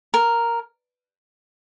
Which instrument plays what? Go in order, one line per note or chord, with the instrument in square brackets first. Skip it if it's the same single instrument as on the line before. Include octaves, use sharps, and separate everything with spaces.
[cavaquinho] A#4